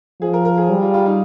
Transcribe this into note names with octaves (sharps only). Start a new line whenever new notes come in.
F3 G#4
A#4
A#4
G#4
G3
F4
F4
D#4